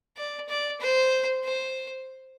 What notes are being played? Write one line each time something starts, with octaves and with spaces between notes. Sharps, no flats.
D5
D5
C5
C5